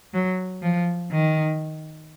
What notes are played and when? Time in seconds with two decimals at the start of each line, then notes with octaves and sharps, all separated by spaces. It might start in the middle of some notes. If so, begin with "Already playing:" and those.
0.13 F#3
0.62 F3
1.11 D#3